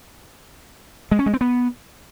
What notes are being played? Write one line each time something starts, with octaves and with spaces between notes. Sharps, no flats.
G#3
C#4
G#3
C4
B3